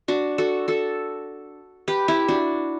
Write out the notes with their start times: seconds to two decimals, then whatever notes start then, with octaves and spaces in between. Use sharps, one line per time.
0.08 D4 F#4
0.38 F#4 A4
0.68 F#4 A4
1.88 G4 B4
2.08 E4 G4
2.28 D4 F#4